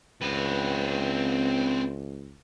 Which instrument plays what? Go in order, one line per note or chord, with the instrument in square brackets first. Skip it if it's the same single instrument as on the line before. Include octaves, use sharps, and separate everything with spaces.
[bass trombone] C#2 [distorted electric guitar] C4 B4